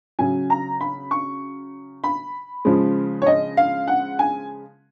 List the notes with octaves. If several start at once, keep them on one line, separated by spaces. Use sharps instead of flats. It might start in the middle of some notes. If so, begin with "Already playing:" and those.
C#3 F#3 G#5
A#5
B5
C#6
B5
C#3 F3 G#3
C#5
D#5
F5
F#5
G#5